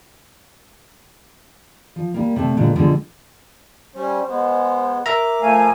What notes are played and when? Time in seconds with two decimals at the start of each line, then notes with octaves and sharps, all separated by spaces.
1.96 F3
2.14 G3 A#3
2.36 C3 A3 A5
2.57 A#2 D3 F#3 G#3
2.76 B2 D3 F3 G3 G#3
3.95 G3 C#4 C5
4.28 G#3 B3
5.06 A#4 E5 A#5 D6
5.42 F3 A3 F5 G#5